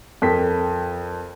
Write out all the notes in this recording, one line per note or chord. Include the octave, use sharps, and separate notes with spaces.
F2 A#4 B6